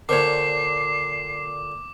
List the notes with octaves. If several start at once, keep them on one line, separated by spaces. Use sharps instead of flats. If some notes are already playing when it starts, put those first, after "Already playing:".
A#2 D3 A#4 C5 C#5 D6 C7